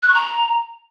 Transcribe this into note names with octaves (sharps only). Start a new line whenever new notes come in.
F#6
C#6
A#5